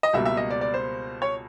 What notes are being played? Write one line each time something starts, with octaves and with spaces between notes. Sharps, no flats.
D#5
C#2 B2 G3 A#3 E5
E5
D#5
D5
D5
C5
C#5